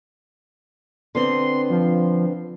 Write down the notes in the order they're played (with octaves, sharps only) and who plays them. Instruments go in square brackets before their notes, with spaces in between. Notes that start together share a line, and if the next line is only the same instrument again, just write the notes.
[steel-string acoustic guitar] D3 B3 C4 [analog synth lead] C6
[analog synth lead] F3